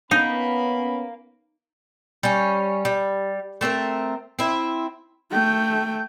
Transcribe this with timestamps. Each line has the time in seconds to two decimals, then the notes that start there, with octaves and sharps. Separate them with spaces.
0.11 B3 C#4 D#4 A#4 F5 B5
2.23 G3 C#4
2.85 G3
3.61 A3 C4 G4 A#4
4.39 C4 E4
5.30 A3 G5